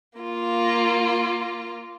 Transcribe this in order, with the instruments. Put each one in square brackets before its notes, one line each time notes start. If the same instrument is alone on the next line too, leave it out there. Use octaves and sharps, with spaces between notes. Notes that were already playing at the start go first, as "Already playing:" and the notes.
[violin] A#3 F4